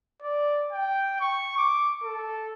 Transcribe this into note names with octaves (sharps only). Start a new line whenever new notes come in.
D5
G5
C#6
D6
A4